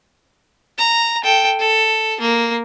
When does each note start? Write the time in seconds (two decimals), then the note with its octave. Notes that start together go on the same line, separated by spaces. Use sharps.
0.78 A#5
1.23 A4 G5
1.59 A4
2.20 A#3